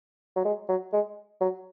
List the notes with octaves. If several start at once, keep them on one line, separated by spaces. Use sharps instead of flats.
F#3
G#3
F#3
G#3
F#3